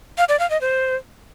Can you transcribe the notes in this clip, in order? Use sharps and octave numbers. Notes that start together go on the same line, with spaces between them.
F5
D5
F5
D#5
C5